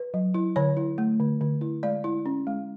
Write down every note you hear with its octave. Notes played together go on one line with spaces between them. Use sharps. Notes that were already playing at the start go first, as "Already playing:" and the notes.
Already playing: B4
F#3
E4
D3 C#5
E4
A3
D3
D3
E4
G#3 D5
E4
C#4
G#3